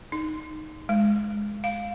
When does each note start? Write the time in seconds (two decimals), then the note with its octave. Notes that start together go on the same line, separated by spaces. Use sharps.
0.12 D#4
0.89 G#3
1.64 F5